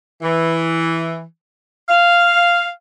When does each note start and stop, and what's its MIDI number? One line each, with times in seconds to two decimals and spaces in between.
0.22 1.24 52
1.89 2.67 77